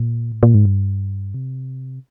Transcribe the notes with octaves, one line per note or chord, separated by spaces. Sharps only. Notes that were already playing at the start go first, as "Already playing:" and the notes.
Already playing: A#2
A2
A#2
G#2
G2
C3